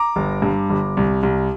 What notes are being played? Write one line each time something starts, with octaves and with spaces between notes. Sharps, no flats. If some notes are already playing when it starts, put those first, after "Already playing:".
Already playing: A#5 D6
G1
G2
G1
C2
C2